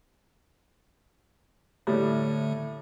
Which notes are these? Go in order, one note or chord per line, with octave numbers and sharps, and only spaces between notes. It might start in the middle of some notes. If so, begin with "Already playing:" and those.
A2 D3 G3 A3